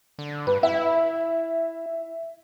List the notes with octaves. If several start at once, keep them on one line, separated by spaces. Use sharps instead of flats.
D3
G2 B4
E4 E5